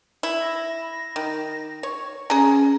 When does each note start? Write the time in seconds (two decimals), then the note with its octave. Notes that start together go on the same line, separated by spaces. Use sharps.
0.23 E4
0.40 A#6
1.16 D#3
1.83 C#5
2.30 C#4 G#4 A#5